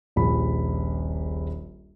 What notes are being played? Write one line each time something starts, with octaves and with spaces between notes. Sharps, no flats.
D#1 A#1 B5